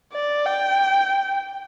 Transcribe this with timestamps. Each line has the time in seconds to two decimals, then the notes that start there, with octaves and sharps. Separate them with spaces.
0.13 D5
0.46 G5